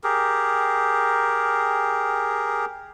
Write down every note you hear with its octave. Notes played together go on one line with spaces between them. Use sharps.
G4 G#4 A#4